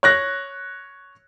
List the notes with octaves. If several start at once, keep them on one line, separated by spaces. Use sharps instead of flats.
C#5 F#6 A#6